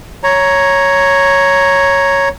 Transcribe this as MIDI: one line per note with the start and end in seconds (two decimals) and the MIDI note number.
0.23 2.29 73
0.23 2.29 82